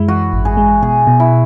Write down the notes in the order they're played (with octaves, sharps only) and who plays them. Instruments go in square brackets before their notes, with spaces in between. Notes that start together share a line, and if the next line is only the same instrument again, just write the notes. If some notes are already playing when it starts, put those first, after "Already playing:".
Already playing: [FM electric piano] F#2 G#3 [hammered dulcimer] E4
[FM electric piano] E3 [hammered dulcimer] F#4
[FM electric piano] G#1
[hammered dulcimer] G#4
[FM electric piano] G#3
[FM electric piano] B2 [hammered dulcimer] G#4
[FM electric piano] B2
[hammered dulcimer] E4